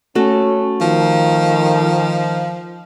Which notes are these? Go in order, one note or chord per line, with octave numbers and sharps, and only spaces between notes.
A3 C#4 F#4 A4
D#3 F3